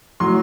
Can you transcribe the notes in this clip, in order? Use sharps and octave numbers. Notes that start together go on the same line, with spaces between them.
A2 F#3 C6